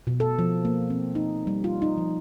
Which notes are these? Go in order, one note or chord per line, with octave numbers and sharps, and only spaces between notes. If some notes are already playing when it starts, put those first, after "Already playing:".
B2
A4
F3
A#3
C4
D#4
G3
F4
D#4
F3